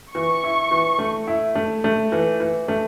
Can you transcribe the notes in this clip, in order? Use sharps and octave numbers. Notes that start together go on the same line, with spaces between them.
E3 C#6
E4
E3
A3
E4
A3
A3
E3
E3
A3